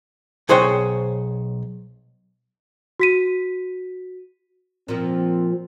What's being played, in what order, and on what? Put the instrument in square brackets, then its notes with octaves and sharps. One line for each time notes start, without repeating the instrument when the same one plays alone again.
[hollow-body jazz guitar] B1 G#4 C5 C#5 F#5 G5
[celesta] F#4 B6 D#7
[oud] A#2 F3 [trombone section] C4